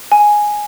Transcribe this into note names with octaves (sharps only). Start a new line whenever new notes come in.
G#5